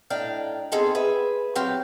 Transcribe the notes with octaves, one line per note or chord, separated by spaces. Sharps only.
A2 D4 D#4 F5 G5
B3 C4 D#4 F4 G#4 A4
G#4 B4 E5
F#3 C4 G4 F5